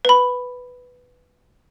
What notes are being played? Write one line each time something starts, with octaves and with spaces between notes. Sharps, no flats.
B4 B5